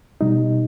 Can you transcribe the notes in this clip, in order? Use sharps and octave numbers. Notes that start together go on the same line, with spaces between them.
B2 G3 D#4